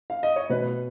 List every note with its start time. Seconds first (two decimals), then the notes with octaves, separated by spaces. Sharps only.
0.10 F5
0.23 D#5
0.36 C#5
0.50 B2 B4